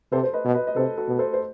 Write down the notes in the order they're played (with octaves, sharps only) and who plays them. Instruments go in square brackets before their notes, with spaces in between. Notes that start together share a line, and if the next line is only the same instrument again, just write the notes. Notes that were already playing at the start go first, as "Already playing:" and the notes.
[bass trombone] C3 [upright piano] A4 C5
[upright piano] C5
B4 D#5
[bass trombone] B2
[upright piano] B4 D#5
D#5
[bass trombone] C3 [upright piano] A4 C5
[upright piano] F#4 A4
[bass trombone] B2
[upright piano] A4 C5
C5